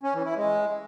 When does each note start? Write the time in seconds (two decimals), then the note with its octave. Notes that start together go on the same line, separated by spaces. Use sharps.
0.03 C#4
0.14 E3
0.25 E4
0.36 G#3